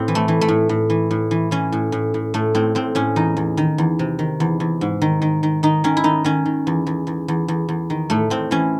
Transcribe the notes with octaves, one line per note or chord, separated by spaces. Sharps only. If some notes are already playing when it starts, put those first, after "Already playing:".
Already playing: A2 C4
E3
A3
E3
A3
A2
A2
E3
A2
E3
E3 C#4
A2
A2
A2
A2 A3
A2 C4
A2 C4
A2 C#4
E2 D#4
E2
D#3
E2
C3
D#3
E2
E2
G#2
D#3
D#3
D#3
D#3 D#4
D#3 C#4
E4
D#3 D#4
D#3 C#4
D#3
E2
E2
E2
E2
E2
E2
D#3
A2 A3
A2 C4
E3 C#4